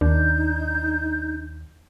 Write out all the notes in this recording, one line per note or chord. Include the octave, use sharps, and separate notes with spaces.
D#2 D4 D#4 G6